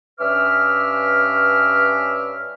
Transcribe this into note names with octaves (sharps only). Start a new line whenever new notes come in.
G2 C#4 B4 E5 D6 F6